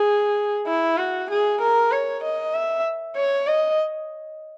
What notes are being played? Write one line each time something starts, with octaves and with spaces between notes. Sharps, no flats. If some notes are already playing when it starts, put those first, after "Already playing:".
Already playing: G#4
E4
F#4
G#4
A#4
C#5
D#5
E5
C#5
D#5